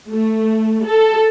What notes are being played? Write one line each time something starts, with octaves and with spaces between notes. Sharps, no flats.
A3
A4